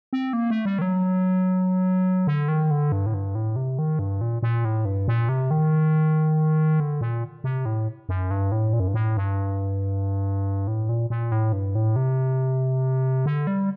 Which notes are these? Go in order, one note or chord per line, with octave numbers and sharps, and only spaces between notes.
C4
A#3
A3
G3
D#3
F#3
D3
D#3
D3
G2
A2
G2
A2
C3
D#3
G2
A#2
A#2
A2
G2
A#2
C3
D#3
D3
A#2
C3
A2
F#2
G2
A2
A#2
F#2
G2
A2
G2
A2
A#2
A#2
A2
G2
A2
C3
D3
G3